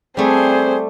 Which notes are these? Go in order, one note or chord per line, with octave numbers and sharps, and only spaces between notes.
G3 A3 C4 G#4 C5